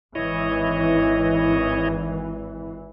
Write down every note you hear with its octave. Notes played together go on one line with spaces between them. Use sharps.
G#1 E3 E4 C#5 D#5